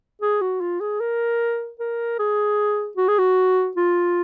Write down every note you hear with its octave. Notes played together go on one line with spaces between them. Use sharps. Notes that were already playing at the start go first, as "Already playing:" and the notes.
G#4
F#4
F4
G#4
A#4
A#4
G#4
F#4
G#4
F#4
F4